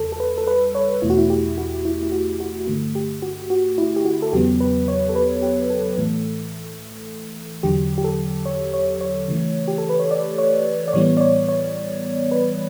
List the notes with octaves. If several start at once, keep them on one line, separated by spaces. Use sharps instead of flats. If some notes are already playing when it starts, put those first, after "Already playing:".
Already playing: E2 C#3 G3 A4
A4
B4
A4
B4
C#5
E2 B2 A3 E4
F#4
E4
G4
F#4
E4
E4
F#4
F#4
G2 D3 A3
G4
F#4
F#4
E4
G4
F#4
A4
E2 C#3 F#3 B3 G4
B4
C#5
A4
B4
G4
A4
A2 E3 A3
E2 D3 F#3 G4
G4
A4
C#5
C#5
C#5
C#3 E3 A3
G4
A4
B4
C#5
D5
C#5
D5
A2 E3 G3 B3 C#5
D5
C#5
C#5
B4